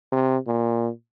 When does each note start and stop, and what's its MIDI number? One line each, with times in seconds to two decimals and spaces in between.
0.12 0.37 48
0.47 0.89 46